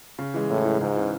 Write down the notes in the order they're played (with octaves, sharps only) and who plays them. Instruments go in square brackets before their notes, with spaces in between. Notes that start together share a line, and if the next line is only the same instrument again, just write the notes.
[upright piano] C#3
E3 G#3
[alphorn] A2 [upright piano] C#3
[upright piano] E3 G#3
[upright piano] C#2 [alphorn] G#2
[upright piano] C#3 E3